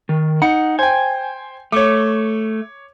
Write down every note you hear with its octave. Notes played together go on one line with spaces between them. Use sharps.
D#3
D#4 F#5 C#7
C5 G5 G#5
A3 C#5 D6